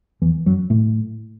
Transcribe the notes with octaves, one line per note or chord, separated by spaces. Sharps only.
E2 E3
F#2 F#3
A2 A3